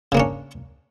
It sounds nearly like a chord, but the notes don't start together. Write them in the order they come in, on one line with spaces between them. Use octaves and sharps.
C#3 A#3 D4 C#4